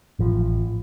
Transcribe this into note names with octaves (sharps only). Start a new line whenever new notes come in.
A1 F3